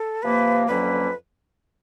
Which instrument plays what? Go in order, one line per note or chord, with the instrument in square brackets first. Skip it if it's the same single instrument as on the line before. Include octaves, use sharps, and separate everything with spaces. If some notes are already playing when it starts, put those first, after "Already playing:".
Already playing: [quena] A4
[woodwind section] C3 F3 A#3 [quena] B4
[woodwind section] F2 D3 F#3 A#3 C#4 [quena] B4